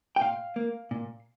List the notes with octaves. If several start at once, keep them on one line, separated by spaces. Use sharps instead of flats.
G5
A#2 F5
A#3
A#2